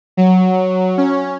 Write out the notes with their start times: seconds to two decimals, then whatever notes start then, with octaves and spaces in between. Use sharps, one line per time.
0.17 F#3
0.98 C#4